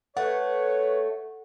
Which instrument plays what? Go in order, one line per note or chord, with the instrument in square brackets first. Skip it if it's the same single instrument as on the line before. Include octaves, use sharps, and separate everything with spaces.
[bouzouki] A3 [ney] B4 [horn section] C#5 [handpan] F#5